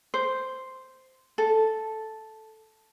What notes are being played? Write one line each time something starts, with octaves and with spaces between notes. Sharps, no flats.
C5
A4